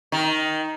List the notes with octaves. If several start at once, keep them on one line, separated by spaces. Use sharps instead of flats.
D#3